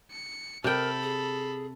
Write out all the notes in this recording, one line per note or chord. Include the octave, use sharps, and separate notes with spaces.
C#7
C3 A4 A#4 G5 B5
G#4